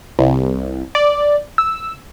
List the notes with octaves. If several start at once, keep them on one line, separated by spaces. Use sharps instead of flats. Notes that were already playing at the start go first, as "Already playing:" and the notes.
C2
D5
E6